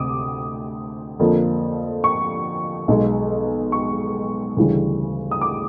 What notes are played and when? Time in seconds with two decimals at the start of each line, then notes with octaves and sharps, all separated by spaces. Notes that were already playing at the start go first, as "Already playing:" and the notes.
Already playing: D2 C3 D6 D#6
1.19 F2 D3 F3 A#3
2.04 C#6
2.88 B1 B2 G#3
3.72 C#6
4.57 D2 C#3 E3 G3
5.31 D#6
5.41 D6